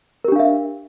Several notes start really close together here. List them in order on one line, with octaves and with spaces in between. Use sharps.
A#4 G4 D4 F5 E5